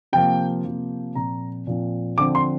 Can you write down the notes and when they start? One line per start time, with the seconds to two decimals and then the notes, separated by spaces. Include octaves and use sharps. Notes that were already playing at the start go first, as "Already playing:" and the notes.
0.13 C3 F3 A#3 G5
0.64 C3 F3 A#3
1.15 A#2 F3 C4 A#5
1.67 A#2 F3 C4
2.18 D3 F3 C4 D6
2.35 C6